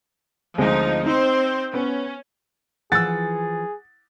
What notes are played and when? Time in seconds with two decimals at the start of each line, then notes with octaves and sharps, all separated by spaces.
0.58 D2 F3 G#3 C4 D#4
1.06 C4 D#4 C5
1.74 B3 C#4
2.92 E3 F3 G#4 F#5 E6 A6